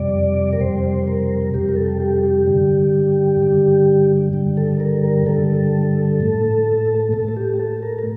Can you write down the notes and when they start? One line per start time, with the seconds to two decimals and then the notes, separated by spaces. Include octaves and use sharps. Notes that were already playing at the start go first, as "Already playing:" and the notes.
Already playing: F2 C3 G3 D5
0.53 A#4
0.60 F2 C3 G3 C5
1.08 A#4
1.54 F2 C3 G3 G4
1.69 A#4
1.76 A4
2.00 G4
2.23 G4
2.47 G2 D3 G3
3.40 G2 D3 G3
4.33 G2 D3 G3
4.57 A4
4.80 A#4
5.04 A#4
5.26 G2 D3 G3 A4
6.21 A2 A3
7.13 A2 A3 A4
7.29 A4
7.37 G4
7.53 G4
7.59 A4
7.83 A#4
7.99 A#4